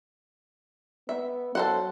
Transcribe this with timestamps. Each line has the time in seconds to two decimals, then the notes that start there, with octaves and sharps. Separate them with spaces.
1.09 B3 E5
1.55 F#3 A4 C5 F#5